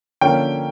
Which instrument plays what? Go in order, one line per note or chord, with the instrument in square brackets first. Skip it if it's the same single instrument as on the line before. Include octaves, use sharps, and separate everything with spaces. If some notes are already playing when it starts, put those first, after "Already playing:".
[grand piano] D3 F3 A#3 C#4 G5